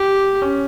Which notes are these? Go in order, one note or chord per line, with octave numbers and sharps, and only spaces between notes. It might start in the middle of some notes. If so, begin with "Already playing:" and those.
Already playing: G4
C#4